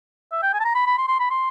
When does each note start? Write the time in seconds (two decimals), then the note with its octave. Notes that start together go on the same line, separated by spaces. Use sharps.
0.32 E5
0.43 G5
0.53 G#5
0.60 A5
0.65 A#5
0.75 B5
0.87 B5
0.97 C6
1.08 C6
1.20 B5
1.30 C6